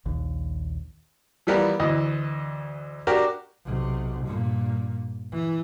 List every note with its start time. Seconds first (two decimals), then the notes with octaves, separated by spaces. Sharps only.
0.06 A#1 D#2
1.47 E3 F3 G3 B3 A#4
1.80 D2 E3 D#5
3.07 D4 F#4 G4 A#4
3.65 B1 C3
4.25 G2 A#2
5.32 E3